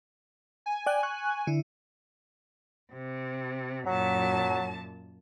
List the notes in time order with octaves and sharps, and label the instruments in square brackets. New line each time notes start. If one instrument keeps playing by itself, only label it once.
[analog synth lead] G#5
[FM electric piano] D5 G5 F#6
C#6 F#6
D3 E4
[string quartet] C3
[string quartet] F#2 A#2 A5 [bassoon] F#3